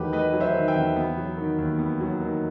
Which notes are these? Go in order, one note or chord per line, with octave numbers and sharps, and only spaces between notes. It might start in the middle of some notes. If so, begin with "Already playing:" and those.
Already playing: E2 D#3 F#3 A3 G4 B4
A3 B4 D#5
F#3
C5 E5
D#3
E5 G5
E2
B3
F#3
D#3
D#2
B3
F#3
D#3